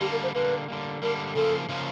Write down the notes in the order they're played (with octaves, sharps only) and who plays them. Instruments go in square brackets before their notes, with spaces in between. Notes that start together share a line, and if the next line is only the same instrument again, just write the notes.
[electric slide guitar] D3 G3 A#3 [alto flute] G4
[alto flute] A#4
C5
[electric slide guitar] D3 G3 A#3 [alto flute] B4
[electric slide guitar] D3 G3 A#3
[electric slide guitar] D3 G3 A#3 [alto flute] A#4
[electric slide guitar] C#3 F3 A#3 [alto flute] A4
[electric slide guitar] C#3 F3 A#3